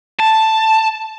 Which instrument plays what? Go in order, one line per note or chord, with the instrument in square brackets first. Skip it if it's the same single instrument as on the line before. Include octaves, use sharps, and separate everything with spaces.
[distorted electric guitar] A5